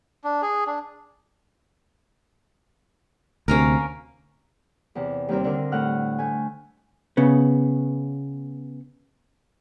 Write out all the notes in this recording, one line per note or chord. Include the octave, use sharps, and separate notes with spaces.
D4
G#4
D4
D2 C3 A#3 C#4 A#4
E2 C3
D#2 G3 C4 A#4
D3 D4 A#4
A2 F#5 F6
A3 G#5
C#3 B3